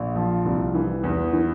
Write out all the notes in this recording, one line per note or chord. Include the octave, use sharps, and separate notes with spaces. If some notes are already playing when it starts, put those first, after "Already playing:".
Already playing: A#1
F3
C2
E3
E2
E3